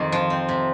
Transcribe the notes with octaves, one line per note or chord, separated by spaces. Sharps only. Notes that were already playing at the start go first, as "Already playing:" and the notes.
Already playing: F2 D#3
F3
C4
C3